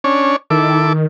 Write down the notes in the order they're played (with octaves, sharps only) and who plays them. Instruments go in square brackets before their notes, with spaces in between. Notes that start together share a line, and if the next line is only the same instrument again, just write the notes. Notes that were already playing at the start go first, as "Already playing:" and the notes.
[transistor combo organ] C#4 D4 C#5
[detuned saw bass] D#3 [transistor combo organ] E4 A4 D6